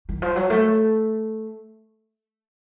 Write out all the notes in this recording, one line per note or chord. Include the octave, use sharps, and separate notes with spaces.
D#3
F3
F#3
A3